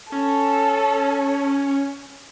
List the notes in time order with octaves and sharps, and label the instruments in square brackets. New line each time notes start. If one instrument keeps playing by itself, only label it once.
[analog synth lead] C#4 [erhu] A4